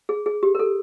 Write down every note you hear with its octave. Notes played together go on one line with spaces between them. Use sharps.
G#4
G#4
G4
A#4
A4